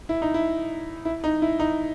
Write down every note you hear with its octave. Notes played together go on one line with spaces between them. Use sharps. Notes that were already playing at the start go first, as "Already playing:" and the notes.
E4
D#4
E4
E4
D#4
E4
D#4